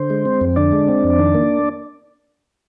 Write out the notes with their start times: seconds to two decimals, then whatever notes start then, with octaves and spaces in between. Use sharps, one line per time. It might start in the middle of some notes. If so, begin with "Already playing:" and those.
Already playing: D3 C5
0.10 G#3
0.26 C4
0.41 F2
0.56 D3 D4 D5
0.72 G#3
0.88 C4
1.04 F2
1.19 D#3
1.34 A#3